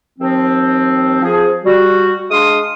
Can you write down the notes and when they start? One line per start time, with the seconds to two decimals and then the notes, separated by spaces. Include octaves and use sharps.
0.19 D#2 F3 C4
1.21 F3 G#4
1.63 G3 F#4
2.30 G#3 D4 F5 C6 D#6